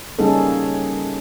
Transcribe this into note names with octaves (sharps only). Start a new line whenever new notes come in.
G3 A#3 C#4 D#4 G#4 A4